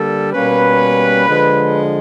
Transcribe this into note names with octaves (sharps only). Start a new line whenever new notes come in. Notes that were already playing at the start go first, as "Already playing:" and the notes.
Already playing: D3 G3 A#3 A4
B2 G3 A#3 C#4 B4
D3 F3 G#3